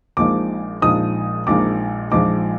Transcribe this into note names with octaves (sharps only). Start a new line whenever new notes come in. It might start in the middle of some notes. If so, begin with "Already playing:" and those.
A#1 A#2 F3 G#3 D#4 D6
A#1 A#2 F3 G#3 D#4 D#6
A#1 A#2 F3 G#3 D#4 D6
A#1 A#2 F3 G#3 D#4 D6